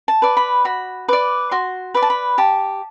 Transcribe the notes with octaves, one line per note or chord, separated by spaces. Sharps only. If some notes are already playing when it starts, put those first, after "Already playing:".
A5
B4 D5
B5
F#4 B5
B4 D5 D6
F#4 C6
B4 D5 B5
A5
B5
G4 A5